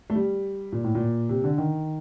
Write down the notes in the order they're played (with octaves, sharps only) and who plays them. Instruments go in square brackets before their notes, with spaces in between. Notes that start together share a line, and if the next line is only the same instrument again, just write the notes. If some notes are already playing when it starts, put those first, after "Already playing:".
[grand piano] A3
G3
A#2
A2
A#2
C3
D3
D#3